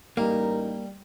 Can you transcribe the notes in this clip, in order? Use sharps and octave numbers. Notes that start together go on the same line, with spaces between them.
A1 G3 A#3 D#4 A#4